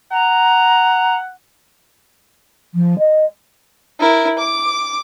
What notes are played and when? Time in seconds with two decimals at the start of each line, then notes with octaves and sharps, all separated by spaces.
0.11 F#5 A#5
2.74 F3
2.98 D#5
4.00 E4 A#4
4.38 D6